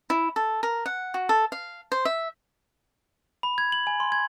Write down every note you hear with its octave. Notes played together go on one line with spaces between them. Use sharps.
E4
A4
A#4
F#5
F#4
A4
F5
C5
E5
B5
G#6
F#7
G#5
C6
G#6